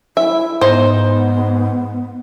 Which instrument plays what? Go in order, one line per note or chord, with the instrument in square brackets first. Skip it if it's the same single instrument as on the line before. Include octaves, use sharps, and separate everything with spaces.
[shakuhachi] E4 [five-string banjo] E5
[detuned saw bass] G#2 [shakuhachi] B3 [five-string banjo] D#4 C5